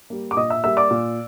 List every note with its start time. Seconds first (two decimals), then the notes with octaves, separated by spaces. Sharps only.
0.10 G3 A#3
0.31 D6
0.37 A#2 D#5 D#6
0.50 E5 E6
0.64 G3 A#3 E5 E6
0.77 D5 D6
0.91 A#2